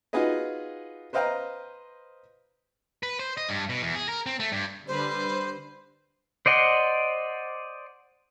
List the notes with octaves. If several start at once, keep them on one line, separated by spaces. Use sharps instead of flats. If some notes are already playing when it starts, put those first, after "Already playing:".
D#4 F4 F#4 G#4 B4 D#5
B4 C5 D#5 F5 G5 A#5
B4
C5
D#5
G2
B2
E2
G#4
A#4
C4
A3
G2
D3 G3 B4 C5
C5 D5 D#5 F#5 C6